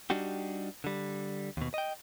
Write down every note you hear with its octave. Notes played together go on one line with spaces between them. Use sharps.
G3 D4 D#4 F#4 G4
D3 G3
D#2 B2
D#5 G5